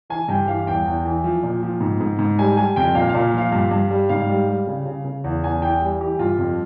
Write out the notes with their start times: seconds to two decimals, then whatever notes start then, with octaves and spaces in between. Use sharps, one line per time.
0.10 E3 G#5
0.28 G2 G5
0.48 E3 F5
0.67 E2 G5
0.85 E2
1.05 E3
1.24 F3
1.43 A#2
1.63 F3
1.81 G#2
2.01 G#2
2.19 G#2
2.39 G3 G#5
2.57 G3 G#5
2.76 F2 G5
2.95 A#2 F5
3.09 F5
3.14 A#2
3.34 F3 F5
3.52 G2
3.71 G2
3.91 G3
4.09 G#2 F5
4.29 G3
4.49 G3
4.67 C#3
4.86 C#3
5.05 C#3
5.24 E2
5.43 E2 G#5
5.62 E3 G5
5.82 G3
6.01 E3 G4
6.19 G2 F4
6.39 F2